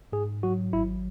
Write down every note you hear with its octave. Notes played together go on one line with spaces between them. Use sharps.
G#2 G#4
F#3 F#4
G#1 E4